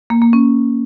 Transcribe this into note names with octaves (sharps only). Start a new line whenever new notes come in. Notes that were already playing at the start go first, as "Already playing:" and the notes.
A#3
A#3
C#4